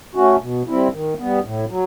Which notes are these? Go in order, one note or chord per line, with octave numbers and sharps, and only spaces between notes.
A3 C#4 F#4
B2
G3 C4 E4
D#3
G3 B3
A2
F#3